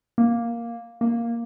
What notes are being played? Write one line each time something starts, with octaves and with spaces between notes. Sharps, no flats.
A#3
A#3